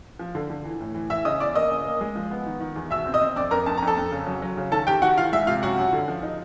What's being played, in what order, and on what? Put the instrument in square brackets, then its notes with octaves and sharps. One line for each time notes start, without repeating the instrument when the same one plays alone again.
[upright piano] F3
D3
D3
E3
A2
E3
E3 E5 E6
C#3 D#5 D#6
E2 D5 D6
A#3 D#5 D#6
C#3
A#3
G#3
F3
B3
D#3
D#3
E2
B2 E5 E6
C4
D#5 D#6
C4
F2 D5 D6
F2 A#4 A#5
F2 A5
F2 A#5
A4 A5
F2
C#3
F#3
F#3
C#3
D#3 A4 A5
D#3 G4 G5
D#3 F#4 F#5
E3 F4 F5
G#3 E5
C3 F4 F5
F#2 F#4 F#5
F#2
D3
F3
D#4